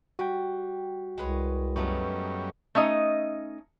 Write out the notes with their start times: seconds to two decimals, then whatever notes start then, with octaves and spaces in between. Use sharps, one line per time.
0.19 G3 F#4 G5
1.18 C2 G#3 B4 C#5
1.76 F#2 G3 A3 B3 C#4 D#4
2.75 A3 C#4 D#4 D#5